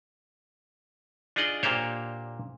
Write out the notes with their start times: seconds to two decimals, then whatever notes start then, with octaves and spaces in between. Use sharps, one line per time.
1.36 D4 D#4 F4 G#4 D5 D#5
1.63 A#2 A#3 D4 G4 C5 C#5